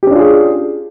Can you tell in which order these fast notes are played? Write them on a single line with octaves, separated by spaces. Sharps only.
G4 C#4 D4 F4 G#4